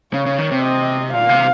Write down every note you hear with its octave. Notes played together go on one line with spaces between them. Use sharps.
C#3 C#5
C#3
D#3
C3
D#5
A#2 F5
C3